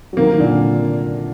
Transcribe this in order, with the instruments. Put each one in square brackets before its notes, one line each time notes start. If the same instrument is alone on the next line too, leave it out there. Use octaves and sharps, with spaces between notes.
[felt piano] F#3
[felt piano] C3 D#3 [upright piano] A#3
[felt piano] D#3
A#2 D3